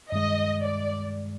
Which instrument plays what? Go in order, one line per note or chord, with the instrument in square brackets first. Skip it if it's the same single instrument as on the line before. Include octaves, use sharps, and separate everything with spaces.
[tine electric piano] G2 D#3 G#3 [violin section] D#5
[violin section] D5